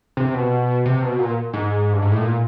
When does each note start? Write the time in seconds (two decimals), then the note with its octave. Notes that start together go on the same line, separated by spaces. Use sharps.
0.17 C3
0.34 B2
0.86 C3
1.02 B2
1.19 A#2
1.53 G#2
1.93 G2
2.02 G#2
2.12 A2
2.21 A#2